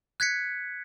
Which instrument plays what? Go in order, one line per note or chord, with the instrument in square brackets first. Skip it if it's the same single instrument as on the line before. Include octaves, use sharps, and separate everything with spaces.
[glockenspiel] F#6 G#6 B6 C#7